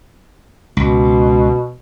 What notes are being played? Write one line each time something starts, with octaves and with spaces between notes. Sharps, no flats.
C#2 B2